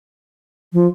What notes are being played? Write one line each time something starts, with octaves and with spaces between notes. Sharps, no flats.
F3